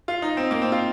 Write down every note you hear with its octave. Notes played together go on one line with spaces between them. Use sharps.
F4
D#4
C4
A#3
C4
F4